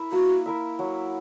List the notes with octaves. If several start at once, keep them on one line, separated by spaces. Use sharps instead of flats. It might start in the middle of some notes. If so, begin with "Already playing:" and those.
Already playing: E4 A#4 E5
A#3 F#4
E4 A#4 E5
F#3